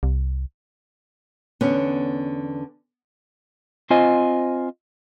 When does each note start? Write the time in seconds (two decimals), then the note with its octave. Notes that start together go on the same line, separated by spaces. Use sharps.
0.03 C2
1.61 E2 D3 B3 C#4
3.90 C4 F4 C5 D#5 G#5